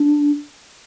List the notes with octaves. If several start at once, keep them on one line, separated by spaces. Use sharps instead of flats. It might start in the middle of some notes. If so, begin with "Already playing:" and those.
Already playing: D4